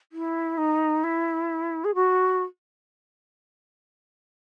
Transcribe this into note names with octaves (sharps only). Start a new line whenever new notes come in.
E4
D#4
E4
G#4
F#4